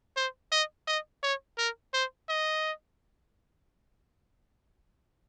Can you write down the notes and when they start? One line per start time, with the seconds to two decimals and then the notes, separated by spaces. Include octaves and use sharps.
0.16 C5
0.52 D#5
0.88 D#5
1.23 C#5
1.58 A#4
1.94 C5
2.29 D#5